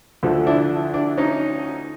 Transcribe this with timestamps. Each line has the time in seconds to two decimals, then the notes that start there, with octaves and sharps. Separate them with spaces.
0.23 D2 D3 F3 A3
0.47 D4 E4
0.94 D4 E4
1.18 C#4 D#4